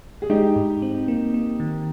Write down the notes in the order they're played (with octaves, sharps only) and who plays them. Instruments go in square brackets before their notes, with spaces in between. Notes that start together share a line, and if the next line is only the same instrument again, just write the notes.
[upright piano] G#4
[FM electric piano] G#3 [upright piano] D#4 G4
[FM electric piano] G#2
C4
A#3
A#3
D#3